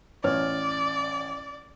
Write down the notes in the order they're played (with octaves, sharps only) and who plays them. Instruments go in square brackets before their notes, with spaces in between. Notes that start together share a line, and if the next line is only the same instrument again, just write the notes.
[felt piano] A1 C#5 F6 [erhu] D5